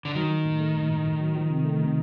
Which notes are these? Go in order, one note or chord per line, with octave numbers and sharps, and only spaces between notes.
D3
D#3 F#3
F#3
A2
A3
A2
A2
A2
F#3
F3
C3
A3
C3